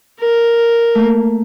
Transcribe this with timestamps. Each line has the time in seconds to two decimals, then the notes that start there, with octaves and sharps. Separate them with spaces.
0.20 A#4
0.95 A3 A#3